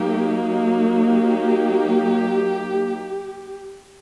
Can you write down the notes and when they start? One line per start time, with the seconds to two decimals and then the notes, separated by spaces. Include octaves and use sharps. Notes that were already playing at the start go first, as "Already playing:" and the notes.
Already playing: F#3 A#3 D#4 G4
1.04 G4